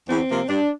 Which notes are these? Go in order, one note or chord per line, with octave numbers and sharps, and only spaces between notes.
E2 C4
C3 F3 A#3
G2 D4